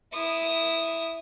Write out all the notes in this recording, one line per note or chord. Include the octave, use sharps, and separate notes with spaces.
E4 D#6